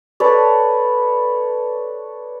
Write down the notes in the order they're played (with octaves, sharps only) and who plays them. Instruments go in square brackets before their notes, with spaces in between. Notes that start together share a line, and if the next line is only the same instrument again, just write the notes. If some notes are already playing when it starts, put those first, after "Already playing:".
[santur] A4 B4 C#5 D5